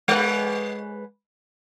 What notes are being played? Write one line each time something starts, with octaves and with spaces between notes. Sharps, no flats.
G#3 B4